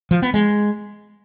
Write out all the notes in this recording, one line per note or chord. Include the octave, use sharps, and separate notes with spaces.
F3
B3
G#3